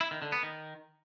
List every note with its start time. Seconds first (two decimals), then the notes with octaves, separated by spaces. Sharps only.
0.01 E4
0.11 D#3
0.22 D3
0.32 B3
0.43 D#3